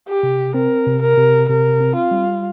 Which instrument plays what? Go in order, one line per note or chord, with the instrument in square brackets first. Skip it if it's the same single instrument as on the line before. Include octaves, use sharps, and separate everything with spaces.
[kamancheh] G4
[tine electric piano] C3
[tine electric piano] C4 [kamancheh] A#4
[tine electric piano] C3
[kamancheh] A#4
[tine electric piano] C3
[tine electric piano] C3 [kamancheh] A#4
[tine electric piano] C4
[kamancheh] F4
[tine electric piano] G3